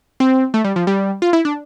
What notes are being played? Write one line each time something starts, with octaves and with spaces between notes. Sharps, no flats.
C4
A3
G3
F3
G3
F4
E4
D4